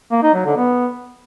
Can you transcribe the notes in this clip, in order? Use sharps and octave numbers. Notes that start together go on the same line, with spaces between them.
A#3
D#4
F#3
D3
B3